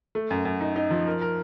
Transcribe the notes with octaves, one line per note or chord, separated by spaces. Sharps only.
A3
F#2
F#2
D#4
D#4
F3
A#4
A#4